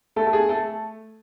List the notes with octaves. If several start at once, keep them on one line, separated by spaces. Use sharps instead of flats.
A3 A4
A4
G#4
A3 A4